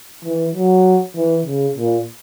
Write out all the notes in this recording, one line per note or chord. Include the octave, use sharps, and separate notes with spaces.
E3
F#3
E3
C#3
A#2